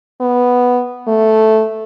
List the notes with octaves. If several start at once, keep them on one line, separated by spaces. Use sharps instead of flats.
B3
A3